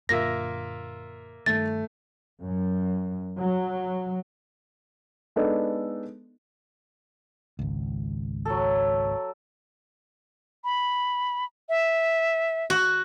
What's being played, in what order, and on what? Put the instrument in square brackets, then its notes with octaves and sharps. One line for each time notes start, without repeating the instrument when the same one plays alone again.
[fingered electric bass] F#2 A#2 D3 [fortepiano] A#3 F4 E5 [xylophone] A#6
[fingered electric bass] G2 D#3 [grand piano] A3 [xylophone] A6
[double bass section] F#2
F#3
[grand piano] G#3 B3 D4 D#4 A4
[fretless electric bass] G#1 C#2
[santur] F#3 A4
[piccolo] B5
E5
[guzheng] F#4